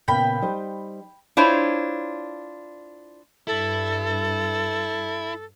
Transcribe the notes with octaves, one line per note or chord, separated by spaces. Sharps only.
A#2 C#3 B3 G5 B5
G3 D#4 C5
D4 E4 F4 C5 C#5
G2 E4 A4